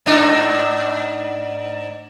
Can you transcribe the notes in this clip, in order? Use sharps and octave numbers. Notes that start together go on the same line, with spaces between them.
G#2 D4 D#4